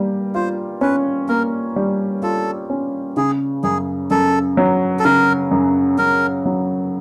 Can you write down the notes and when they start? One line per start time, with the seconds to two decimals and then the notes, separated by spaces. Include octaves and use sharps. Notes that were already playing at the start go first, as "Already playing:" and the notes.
Already playing: G3 A#3
0.35 F4 C5
0.81 C#4 B4
1.29 A#3 A#4
1.76 G3
2.23 F4 A4
2.70 C#4
3.17 C#3 G#4
3.63 F#2 G#4
4.11 F#2 A4
4.57 F#3
5.00 A4
5.05 C#3 A#4
5.51 F#2
5.98 F#2 A#4
6.45 F#3